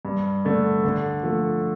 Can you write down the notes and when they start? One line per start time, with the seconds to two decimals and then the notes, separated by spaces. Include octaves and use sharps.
0.05 G2
0.45 D3 A3 D4
0.84 D3
1.23 F3 A3